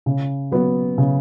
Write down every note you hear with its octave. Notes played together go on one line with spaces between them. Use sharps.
C#3
F#3 B3
C#3